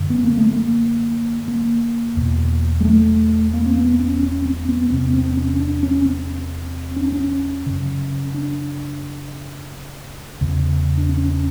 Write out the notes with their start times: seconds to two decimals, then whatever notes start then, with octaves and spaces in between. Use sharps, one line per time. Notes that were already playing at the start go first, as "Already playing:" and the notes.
Already playing: F#2 D3
0.10 B3
0.24 A#3
0.37 A3
0.51 A#3
1.48 A#3
2.17 E2 B2
2.81 G#3
2.85 A3
3.54 A#3
3.66 C4
3.76 B3
3.99 C#4
4.23 C#4
4.46 C4
4.69 B3
4.90 E2 C3 C4
5.13 C4
5.37 C#4
5.60 D4
5.83 C#4
6.06 C4
6.96 C#4
7.05 D4
7.12 C#4
7.66 F#2 C#3
8.34 D4
10.41 E2 C#3
10.97 D4
11.09 C#4
11.26 C#4